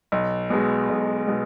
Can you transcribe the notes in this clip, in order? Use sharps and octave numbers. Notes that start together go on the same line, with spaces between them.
B1
B2 G#3
B1
B2 G#3